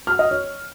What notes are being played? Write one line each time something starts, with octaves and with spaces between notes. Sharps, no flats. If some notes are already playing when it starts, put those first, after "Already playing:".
F6
D#5
C#5